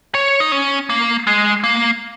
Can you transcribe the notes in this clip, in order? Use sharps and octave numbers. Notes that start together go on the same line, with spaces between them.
C#5
D#4
C#4
A#3
G#3
A#3